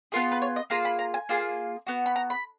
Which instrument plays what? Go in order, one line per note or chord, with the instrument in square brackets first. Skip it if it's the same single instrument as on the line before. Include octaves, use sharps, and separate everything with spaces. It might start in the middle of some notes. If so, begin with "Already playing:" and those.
[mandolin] B3 F4 G#4 A#4
B4
C#5
D#5
A#3 F4 G#4 A#5
B5
A#5
G#5
A#3 F4 G#4
B3 F#4
B5
A#5
B5